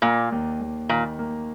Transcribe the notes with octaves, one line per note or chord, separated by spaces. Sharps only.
A#2 A#3
D#2
D#2
A#2 D#3
A#3